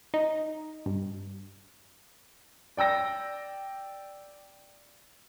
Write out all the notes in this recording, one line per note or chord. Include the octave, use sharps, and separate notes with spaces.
D#4
G2
D5 G5 E6 A#6